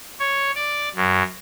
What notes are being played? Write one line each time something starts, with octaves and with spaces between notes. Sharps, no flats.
C#5
D5
F#2